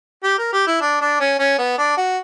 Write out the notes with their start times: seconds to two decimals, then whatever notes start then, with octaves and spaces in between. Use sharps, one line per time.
0.23 G4
0.38 A#4
0.53 G4
0.67 E4
0.81 D4
1.01 D4
1.20 C#4
1.39 C#4
1.59 B3
1.78 D4
1.97 F#4